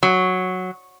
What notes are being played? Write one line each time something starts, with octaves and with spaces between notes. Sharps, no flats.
F#3